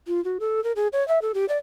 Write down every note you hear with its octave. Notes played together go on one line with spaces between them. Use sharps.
F4
F#4
A4
A#4
G#4
C#5
E5
A4
G4
D5